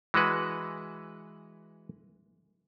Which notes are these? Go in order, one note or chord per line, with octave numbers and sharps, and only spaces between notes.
E3 G#3 F#4 B4